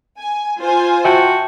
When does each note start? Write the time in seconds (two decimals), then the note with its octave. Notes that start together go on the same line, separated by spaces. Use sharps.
0.19 G#5
0.60 F4 C5 G#5
1.05 F#4 E5 G5 A5